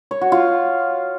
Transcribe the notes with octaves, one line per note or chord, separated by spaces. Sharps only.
C#5
F#4
F4